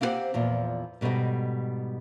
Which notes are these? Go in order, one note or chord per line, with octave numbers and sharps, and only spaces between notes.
A#3 C4 E4 G4 C5 F#5
E2 A#2 F3
G#2 B2 G3 A4 D#5